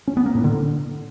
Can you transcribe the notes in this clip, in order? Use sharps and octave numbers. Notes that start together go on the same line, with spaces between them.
C#4
B3
A#3
A2
D3